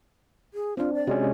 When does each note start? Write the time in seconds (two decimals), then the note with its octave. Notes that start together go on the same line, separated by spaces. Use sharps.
0.54 G#4
0.77 C4 D4 F4
0.94 D5
1.07 C3 G#3 C#4 F#4